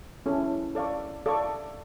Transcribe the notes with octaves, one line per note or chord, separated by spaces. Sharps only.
C#4 E4 A4
A4 D5 F5 C#6
A4 D5 F5 C#6